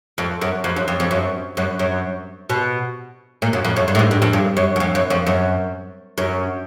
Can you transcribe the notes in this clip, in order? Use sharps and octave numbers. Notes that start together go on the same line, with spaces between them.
F2
F#2
F2
F#2
F2
F2
F#2
F#2
F#2
B2
A#2
F#2
F2
F#2
G2
A2
G#2
G2
F2
G2
F#2
F#2
F2
F#2
F2
F#2
F#2